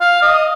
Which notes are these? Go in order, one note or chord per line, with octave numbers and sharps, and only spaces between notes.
F5
D#5